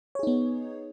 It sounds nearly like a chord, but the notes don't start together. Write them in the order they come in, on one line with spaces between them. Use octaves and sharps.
C#5 G#4 D#4 B3